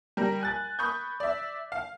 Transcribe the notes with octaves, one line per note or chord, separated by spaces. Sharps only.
G3 A#4
G#5 F#6 A6
B5 C#6 D#6 G6
D5 E5
F5